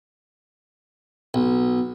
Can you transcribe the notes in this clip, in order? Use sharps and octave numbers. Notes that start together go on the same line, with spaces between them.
B1